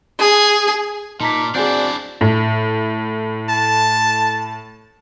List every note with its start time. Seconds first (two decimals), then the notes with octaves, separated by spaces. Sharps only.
0.19 G#4
1.21 A#2 D#4 A5 A#5 D6 F6 B6
1.55 C4 D4 E4 F#4 G#4 D5 G#5 G6
2.21 A2
3.49 A5